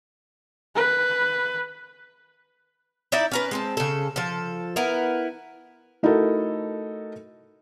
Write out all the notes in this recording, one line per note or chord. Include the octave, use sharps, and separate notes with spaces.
B4
D#4 E4 D5 E5
C#4 A#4 B4
G#3 C4 A5
C#3 A4
F3 A4
B3 E4 A#4
A3 D#4 E4 F#4 A4 A#4